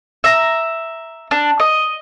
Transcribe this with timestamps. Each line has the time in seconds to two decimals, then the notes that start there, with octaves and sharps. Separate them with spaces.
0.24 E5 A#5
1.31 D4
1.60 D#5